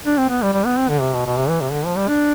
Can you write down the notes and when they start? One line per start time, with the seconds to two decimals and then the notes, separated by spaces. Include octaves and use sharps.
0.05 D4
0.18 C4
0.29 B3
0.42 G3
0.53 G3
0.66 B3
0.78 C4
0.89 D3
1.01 C3
1.13 B2
1.26 B2
1.37 C3
1.49 E3
1.61 C3
1.72 D3
1.85 F3
1.96 G3
2.08 D4